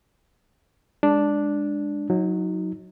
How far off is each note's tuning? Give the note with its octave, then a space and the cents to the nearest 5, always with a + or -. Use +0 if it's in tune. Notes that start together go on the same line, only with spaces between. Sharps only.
G#3 -15 D4 +0
F#3 -10 D#4 +25